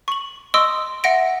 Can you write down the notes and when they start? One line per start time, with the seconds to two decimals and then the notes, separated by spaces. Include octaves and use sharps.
0.08 C#6 F#7
0.54 D#5 C6 C#6 D#6 E6 D7
1.04 E5 F#5 A#6 D7